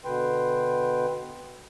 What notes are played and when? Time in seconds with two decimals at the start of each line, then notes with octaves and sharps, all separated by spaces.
0.05 B2 D3 B4 G5 C6